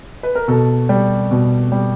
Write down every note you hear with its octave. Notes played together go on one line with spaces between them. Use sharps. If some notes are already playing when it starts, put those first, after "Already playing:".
B4
A#4
B2 A4
G3
B2
G3